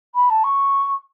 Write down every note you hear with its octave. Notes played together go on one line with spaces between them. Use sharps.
B5
A5
C#6